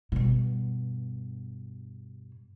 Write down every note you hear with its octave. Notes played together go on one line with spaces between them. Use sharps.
G2 B2